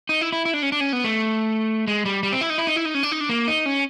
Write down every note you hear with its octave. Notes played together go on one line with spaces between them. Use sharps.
D#4
E4
E4
E4
D4
C#4
D4
C#4
B3
A3
G#3
G3
G3
C4
E4
D#4
E4
D#4
E4
D#4
C#4
D4
D#4
D4
A#3
D#4
C#4